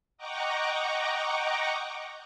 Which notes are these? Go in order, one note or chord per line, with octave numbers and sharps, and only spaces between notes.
D#5 F#5 G5 A#5 C#6 D6